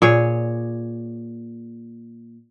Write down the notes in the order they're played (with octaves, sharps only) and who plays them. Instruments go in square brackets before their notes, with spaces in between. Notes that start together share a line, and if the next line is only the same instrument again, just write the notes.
[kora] A#2 G#4 C#5